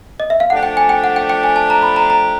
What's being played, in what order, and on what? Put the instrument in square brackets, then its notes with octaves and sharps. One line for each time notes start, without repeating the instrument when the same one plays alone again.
[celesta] D#5
E5
F5
[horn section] F3 A3 D4 G4 [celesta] F#5
[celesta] G5
G#5
G5
F#5
G5
G5
G#5
A5
A#5
B5
A#5
A#5